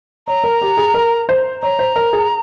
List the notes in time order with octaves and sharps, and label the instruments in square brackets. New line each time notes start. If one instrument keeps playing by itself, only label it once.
[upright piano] C#5 [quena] A#5
[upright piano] A#4
G4
G#4
A#4
C5
[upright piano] C#5 [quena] A#5
[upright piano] C5
A#4
G#4